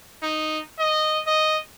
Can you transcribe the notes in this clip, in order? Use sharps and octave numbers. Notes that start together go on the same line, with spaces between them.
D#4
D#5
D#5